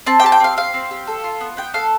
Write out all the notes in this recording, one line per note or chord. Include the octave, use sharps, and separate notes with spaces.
C4 A5
G5
G4 A5
G5
C4 F5
G4 F5
C4
G4
A4
F4
B3
B3 G5
A4 F5